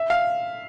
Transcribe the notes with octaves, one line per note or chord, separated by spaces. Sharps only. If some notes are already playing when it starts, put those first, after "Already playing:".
Already playing: E5
F5